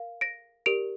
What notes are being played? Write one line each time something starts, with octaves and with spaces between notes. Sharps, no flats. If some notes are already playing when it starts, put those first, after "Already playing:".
Already playing: A#4 F5
A#6 D7
G4 A#4 D5 D7 F7